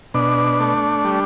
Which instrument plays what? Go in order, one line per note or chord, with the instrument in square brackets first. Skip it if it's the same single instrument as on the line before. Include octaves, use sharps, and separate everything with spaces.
[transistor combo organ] B2 D4
A3
G3